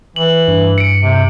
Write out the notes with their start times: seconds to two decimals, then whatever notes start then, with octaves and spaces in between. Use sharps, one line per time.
0.16 E3 F#7
0.48 G2
0.78 C#7 D7
1.01 C3